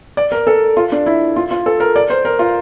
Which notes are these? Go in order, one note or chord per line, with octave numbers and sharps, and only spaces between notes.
D5
A#4
A4
F4
D4
E4
F4
F4
A4
A#4
D5
C5
A#4
F4